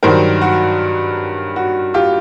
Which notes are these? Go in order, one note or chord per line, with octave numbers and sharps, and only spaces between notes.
G2 D#3 F#3 A#4 C5
F#4
F#4
F4 G4